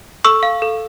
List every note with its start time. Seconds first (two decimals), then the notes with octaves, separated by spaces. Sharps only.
0.24 A4 C#6 E6
0.43 F5
0.62 A4